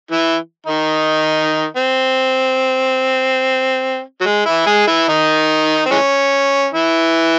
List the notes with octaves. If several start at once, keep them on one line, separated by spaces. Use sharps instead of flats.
E3 E4
D#3 D#4
C4
F#3
G#3
E3 E4
G#3 G#4
E3 E4
D#3 D#4
C4
E3 G#3 C#4
E3 E4